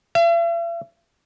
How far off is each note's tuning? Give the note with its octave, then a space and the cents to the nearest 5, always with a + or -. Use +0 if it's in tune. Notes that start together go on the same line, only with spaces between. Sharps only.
E5 +45